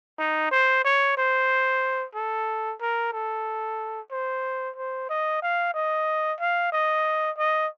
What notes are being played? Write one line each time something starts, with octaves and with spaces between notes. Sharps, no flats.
D#4
C5
C#5
C5
A4
A#4
A4
C5
C5
D#5
F5
D#5
F5
D#5
D#5